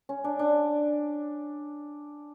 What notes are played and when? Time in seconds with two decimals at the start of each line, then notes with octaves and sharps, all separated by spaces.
0.09 C#4
0.24 D4
0.39 D4